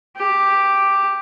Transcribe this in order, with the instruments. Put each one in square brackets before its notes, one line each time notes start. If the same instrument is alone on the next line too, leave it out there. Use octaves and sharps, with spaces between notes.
[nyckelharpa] G4